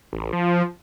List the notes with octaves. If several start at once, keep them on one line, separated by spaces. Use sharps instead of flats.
A1
F3